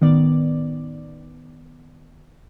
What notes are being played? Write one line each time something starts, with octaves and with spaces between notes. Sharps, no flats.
A1 D#3 B3 D5